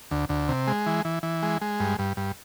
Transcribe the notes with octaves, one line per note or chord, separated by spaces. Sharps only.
D2
D2
C3
G#3
E3
E3
E3
G#3
G#3
G2
G2
G2